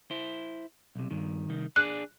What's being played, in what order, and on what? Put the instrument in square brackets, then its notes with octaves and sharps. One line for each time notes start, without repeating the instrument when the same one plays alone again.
[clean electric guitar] E4 C5
B1 C3
G2 D#3
C2 D#3
[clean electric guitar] D4 G#4 D5 [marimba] F#6